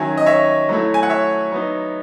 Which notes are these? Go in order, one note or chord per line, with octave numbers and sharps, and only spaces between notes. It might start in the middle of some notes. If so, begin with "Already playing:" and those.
Already playing: D#3 F#3 C#4 E5 G#5
D#5
C#5 E5
F#3 A3 E4
G#5
F#5
C#5 E5
F#3 B3 D#4